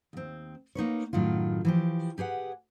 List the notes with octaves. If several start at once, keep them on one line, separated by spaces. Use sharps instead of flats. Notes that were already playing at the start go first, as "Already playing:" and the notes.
D#2 C4
A#3 D#4 B4 C#5
F#2 A2 D#3 F#3 F4
E3 F3 G4
G4 G#4 B4 F#5